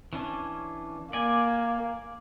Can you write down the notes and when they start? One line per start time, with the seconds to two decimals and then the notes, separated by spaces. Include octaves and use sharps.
0.13 E3 C#4 D4
1.13 A#3 D5 G#5